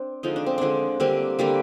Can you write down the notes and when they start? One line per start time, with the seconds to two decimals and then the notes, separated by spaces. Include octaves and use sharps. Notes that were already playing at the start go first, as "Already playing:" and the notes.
Already playing: C4 D4
0.23 D3 F3 G#3 D#4
0.36 D4
0.46 C4
0.58 D3 F3 G#3 D4
1.00 D3 G3 A#3 C4
1.39 D3 G3 A#3